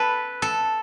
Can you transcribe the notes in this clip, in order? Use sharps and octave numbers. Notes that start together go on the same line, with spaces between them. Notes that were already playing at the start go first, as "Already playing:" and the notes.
Already playing: A4 B4
A4